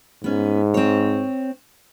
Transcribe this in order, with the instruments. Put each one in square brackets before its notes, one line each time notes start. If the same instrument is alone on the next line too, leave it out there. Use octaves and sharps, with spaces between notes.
[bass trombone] G#2 [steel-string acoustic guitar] B3 C#4
[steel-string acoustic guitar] C4 C#5